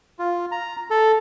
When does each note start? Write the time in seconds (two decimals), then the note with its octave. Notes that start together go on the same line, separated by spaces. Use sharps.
0.19 F4
0.52 A#5
0.90 A4